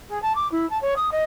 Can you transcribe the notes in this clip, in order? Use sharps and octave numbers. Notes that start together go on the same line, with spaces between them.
G#4
A5
D6
E4
A5
C#5
D#6
D#5